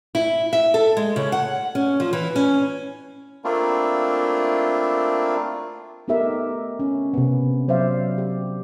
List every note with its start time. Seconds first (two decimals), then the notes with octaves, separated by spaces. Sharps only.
0.15 E4
0.53 E5
0.74 A4
0.97 G#3
1.16 C#3
1.32 F#5
1.75 C#4
2.00 F3
2.13 E3
2.35 C#4
3.44 A3 A#3 C4 D4 E4 F4
6.08 A3 B3 D#4 G4 A#4 E5
6.79 C#4
7.14 C3 B3
7.68 F#3 C5 D5 E5 F5
8.18 G4